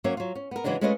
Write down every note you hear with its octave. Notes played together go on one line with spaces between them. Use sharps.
F#3 A#3 C#4 E5
F#3 F4
C#4
B3 A#4
C#3 E3 F#3 G#3 D4
G#3 A3 C#4 F4 B4 D#5